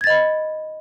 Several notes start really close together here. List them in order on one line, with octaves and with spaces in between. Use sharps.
G#6 A6 D#5 B5